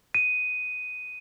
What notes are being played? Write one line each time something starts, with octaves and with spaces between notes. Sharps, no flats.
D#7